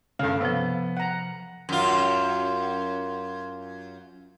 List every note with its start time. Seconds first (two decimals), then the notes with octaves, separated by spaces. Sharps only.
0.19 G2 C#3 A4 F5
0.41 C3 F3 B3
0.97 F#5 A#5
1.69 F#2 F4